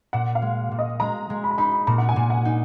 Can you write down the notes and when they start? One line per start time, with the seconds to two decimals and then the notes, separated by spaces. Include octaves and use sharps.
0.13 A#2 F#5
0.35 F5
0.42 G#3
0.72 A#2
0.79 D#5
1.00 G#3 A#5
1.30 G#3
1.44 B5
1.51 A#5
1.58 D#4 B5
1.87 A#2 A#5
1.98 F#5
2.09 G#5
2.16 A#2
2.30 F#5
2.45 D#4